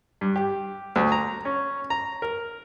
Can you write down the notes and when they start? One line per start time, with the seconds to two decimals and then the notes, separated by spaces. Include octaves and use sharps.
0.21 G2
0.36 G4
0.96 D2
1.12 A#5
1.45 C#4
1.90 A#5
2.22 A#4